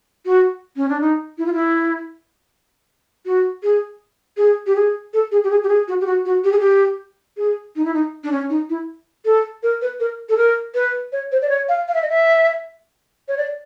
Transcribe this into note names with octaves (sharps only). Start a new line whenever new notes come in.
F#4
C#4
D4
D#4
E4
F4
E4
F#4
G#4
G#4
G4
G#4
A4
G#4
G4
G#4
G4
G#4
F#4
G4
F#4
F#4
G4
G#4
G4
G#4
D#4
E4
D#4
D4
C#4
D#4
E4
A4
A#4
B4
A#4
A4
A#4
B4
C#5
C5
D5
C#5
F5
F5
E5
D#5
E5
C#5
D5